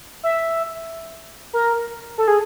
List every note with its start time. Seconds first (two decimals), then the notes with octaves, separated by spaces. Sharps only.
0.23 E5
1.53 A#4
2.18 A4
2.28 G#4